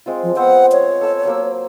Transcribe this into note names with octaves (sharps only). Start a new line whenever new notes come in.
G#3 C4 F4
F3
B3 C4 C5 F#5
C#5
A4 E6
F#3 A#3 E6